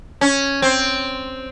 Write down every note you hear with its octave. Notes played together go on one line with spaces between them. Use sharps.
C#4
C4